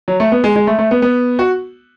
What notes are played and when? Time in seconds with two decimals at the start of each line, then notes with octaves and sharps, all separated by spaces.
0.08 F#3
0.20 A3
0.32 B3
0.44 G#3
0.56 G#3
0.67 A3
0.79 A3
0.91 B3
1.02 B3
1.39 F#4